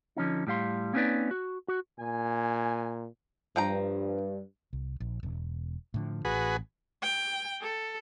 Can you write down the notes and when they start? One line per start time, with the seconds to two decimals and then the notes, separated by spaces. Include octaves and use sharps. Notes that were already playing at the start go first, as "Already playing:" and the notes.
0.17 D3 F3 C#4 D#4
0.47 A2 G3 F5 C6
0.93 A#3 C4 C#4 D#4 B4 D5
1.31 F#4
1.68 F#4
1.99 A#2 G#5
3.56 G2 F3 G5 A#5
4.73 C2
5.00 A#1
5.23 E1
5.94 A2 D3 F3
6.25 A1 F#4 G#4 B4
7.03 G5
7.62 A4